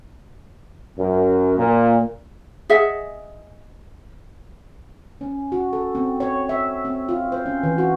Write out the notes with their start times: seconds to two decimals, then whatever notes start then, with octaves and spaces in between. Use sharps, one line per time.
0.99 F#2
1.58 A#2
2.69 G#4 D#5 E5 F#5
5.21 C#4
5.52 F#4
5.73 A4
5.95 C4
6.20 C#5
6.49 E5
6.85 C4
7.09 F4
7.32 C5
7.46 C#4
7.63 E3
7.78 F#4